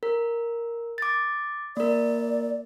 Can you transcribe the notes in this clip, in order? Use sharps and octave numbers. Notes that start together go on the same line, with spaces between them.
A#4
D6 A6
A#3 A#4 D5